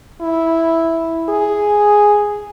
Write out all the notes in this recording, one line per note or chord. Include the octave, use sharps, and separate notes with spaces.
E4
G#4